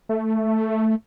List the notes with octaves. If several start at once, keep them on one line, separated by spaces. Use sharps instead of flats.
A3